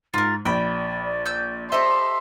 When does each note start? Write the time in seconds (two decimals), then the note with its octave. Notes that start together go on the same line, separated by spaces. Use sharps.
0.14 G#2 F4 A#4 A6
0.45 A#1 D5 G5 B5
1.26 E6 G6
1.72 G4 A4 C5 D#5 E5 C6